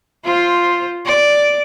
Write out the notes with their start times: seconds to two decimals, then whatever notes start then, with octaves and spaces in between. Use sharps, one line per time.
0.24 F4 C5
1.06 D5